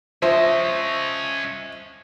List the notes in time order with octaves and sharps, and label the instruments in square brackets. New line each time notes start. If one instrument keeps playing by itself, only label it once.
[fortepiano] F3 [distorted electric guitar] C#4 D#5 [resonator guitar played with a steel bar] C5 [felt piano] E5